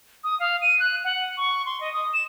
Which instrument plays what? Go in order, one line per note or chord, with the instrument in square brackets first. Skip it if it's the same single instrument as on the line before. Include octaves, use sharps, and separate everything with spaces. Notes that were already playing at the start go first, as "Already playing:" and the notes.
[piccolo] D#6
F5
D#7
F#6
F#5
C#6
C6
D#5
D#6
E7